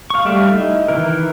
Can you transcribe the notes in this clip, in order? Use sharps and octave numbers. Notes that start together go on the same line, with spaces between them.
F5 C#6
G3 A3 D5 E5 F5
D#4 E4
D#3 E3 E4 A#4